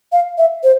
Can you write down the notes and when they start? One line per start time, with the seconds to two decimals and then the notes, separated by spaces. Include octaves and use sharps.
0.12 F5
0.38 E5
0.64 C5